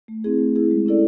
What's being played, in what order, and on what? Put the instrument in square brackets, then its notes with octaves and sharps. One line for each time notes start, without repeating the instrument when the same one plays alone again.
[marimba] A3
C4 E4 G#4
A3
C4 E4 G#4
G#3
C#4 E4 A4 D5